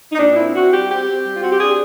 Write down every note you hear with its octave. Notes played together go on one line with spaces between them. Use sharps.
D#4
A#2 D4
C4 E4
C4 F#4
G3 G4
C4 G4
C4
G3
F4
C4 F#4
G4
D4 G#4